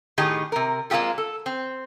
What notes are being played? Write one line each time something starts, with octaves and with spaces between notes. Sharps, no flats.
A2 D#3 D#4 G4 G#4
C3 A#4
G#3 A#3 C4 F4 G4 A4
A4
C4